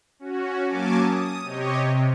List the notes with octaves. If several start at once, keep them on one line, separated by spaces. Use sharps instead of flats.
C#4 F#4
F#3 A#3 C#4 G#5 A5 D6
D#6
C3 G4 C#5 D#5
C3